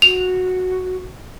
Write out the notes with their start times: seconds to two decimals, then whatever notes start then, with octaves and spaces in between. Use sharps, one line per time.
0.02 F#4 F7